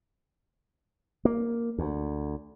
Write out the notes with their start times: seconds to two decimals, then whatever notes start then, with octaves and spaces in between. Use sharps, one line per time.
1.25 A#3
1.78 D2